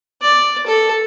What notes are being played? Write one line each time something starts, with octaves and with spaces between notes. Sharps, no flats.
D5
A4